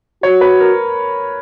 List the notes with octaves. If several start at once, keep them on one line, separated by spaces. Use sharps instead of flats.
F#4 C#5
B4
A#4